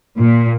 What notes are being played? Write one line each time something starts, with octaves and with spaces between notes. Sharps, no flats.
A#2